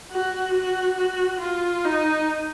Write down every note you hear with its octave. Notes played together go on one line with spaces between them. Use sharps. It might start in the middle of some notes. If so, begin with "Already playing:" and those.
F#4
F#4
F#4
F4
D#4